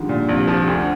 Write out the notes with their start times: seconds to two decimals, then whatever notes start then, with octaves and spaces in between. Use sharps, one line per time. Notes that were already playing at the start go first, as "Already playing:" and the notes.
Already playing: D3 D#3 F3 G3 G#3
0.09 A#2
0.28 A#1 C3
0.48 F3
0.67 D2 D3